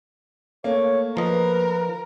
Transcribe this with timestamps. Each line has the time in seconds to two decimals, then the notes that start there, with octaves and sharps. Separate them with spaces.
0.64 A3 A#3 C#5
1.17 F3 A#4 B4 D#5